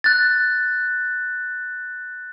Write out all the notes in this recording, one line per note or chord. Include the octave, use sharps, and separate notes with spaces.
F#6 A6